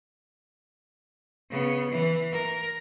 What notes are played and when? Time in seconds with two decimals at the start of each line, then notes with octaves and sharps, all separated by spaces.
1.50 C#3 B3
1.90 E3
2.33 A#4